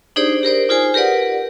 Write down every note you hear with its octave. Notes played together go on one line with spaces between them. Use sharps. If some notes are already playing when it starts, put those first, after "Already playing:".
D4 D#4 G4 G#4 C5 D5
G4 A#4 C5 D5
D#4 F4 G#4 C5 G#5
G4 A#4 B4 D5 F#5